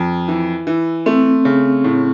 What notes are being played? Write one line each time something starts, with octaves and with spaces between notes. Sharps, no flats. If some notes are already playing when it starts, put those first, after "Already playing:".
Already playing: F2
E3
E3
A3 C4
C#3
A2